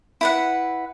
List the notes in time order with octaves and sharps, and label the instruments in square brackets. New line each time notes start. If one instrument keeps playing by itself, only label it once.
[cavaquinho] E4 B4 F#5